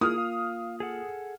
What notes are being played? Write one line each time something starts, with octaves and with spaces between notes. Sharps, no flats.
A#3 E4 F4 G#4 D#6 F6
F5
G#4 A4 F#5